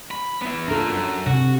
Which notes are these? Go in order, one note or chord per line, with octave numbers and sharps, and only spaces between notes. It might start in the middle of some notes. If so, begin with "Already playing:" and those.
B5
B3 E4
D4 F4 A4 A#4
F#2
C3 F#4